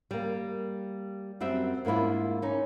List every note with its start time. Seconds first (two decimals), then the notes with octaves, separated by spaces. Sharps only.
0.11 G3 A#3
1.40 F#2 G3 C4 E5
1.85 G#2 A#3 D4 E4 F4
2.42 C#4 D#4